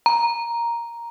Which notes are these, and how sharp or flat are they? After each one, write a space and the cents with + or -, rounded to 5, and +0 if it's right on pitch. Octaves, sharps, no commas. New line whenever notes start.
A#5 +5